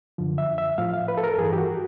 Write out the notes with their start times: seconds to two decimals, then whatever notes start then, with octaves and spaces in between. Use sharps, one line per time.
0.18 F#2 D3 F3
0.38 E5
0.58 E5
0.78 A2 F3 F5
0.93 F5
1.08 B4
1.18 A4
1.24 A#4
1.34 A4
1.38 G2 E3 G#4
1.53 G4
1.58 F#4